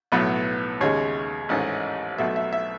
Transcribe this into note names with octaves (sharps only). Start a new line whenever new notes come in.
B1 A2 F#3 B3 B4
D#2 C#3 G#3 C#5
A1 G#2 D#3 A3 C#4 D#5
B1 B2 A3 E5
E5
E5